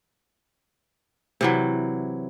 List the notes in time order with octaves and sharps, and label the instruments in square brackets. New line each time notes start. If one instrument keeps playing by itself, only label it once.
[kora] C3 E3 F#3